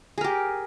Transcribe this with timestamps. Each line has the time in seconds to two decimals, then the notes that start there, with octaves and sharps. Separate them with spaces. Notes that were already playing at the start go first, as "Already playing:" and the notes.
0.18 G#4
0.21 A#4
0.24 G4